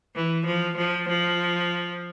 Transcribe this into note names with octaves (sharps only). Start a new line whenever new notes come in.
E3
F3
F3
F3